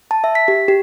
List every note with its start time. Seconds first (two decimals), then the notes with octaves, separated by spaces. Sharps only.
0.11 A5
0.24 E5
0.35 B6
0.48 G4
0.68 G4